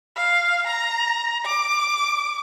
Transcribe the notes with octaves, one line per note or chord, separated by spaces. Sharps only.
F5
A#5
D6